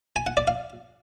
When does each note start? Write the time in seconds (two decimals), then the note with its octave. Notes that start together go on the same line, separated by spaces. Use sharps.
0.16 G#5
0.27 F#5
0.37 D5
0.48 F5